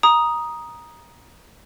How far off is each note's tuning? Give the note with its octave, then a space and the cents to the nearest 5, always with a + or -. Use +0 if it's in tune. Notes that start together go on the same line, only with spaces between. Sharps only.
A#5 +15 D#6 +0